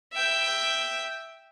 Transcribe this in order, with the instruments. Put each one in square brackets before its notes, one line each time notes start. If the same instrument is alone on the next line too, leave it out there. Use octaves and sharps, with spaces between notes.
[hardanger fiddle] E5 G5